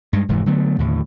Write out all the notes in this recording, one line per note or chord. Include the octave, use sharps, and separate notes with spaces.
G2 G#3
F1 G#2 E3
D3 F#3 A3 B3
D#2 A2 D3